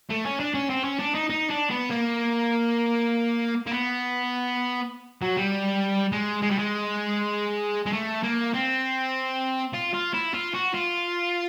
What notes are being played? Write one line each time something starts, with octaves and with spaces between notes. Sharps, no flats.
A3
C#4
D4
C#4
C4
C#4
D4
D#4
D#4
D4
B3
A#3
A#3
B3
F#3
G3
G#3
G#3
G3
G#3
G#3
A3
A#3
C4
F4
F4
E4
F4
F#4
F4